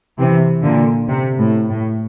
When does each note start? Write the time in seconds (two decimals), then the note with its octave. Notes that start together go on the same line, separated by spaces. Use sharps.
0.18 C3 E3
0.62 A#2 D3
1.08 C3
1.39 A2
1.69 A2